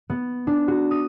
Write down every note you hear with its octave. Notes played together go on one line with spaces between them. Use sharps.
B3
D4
F#4
D#6